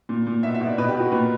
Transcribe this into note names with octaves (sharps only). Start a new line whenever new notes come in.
A#2
A#2
B2 E5
E5
B2
D5
B2 B4
G4
B2
F#4
A#2 B4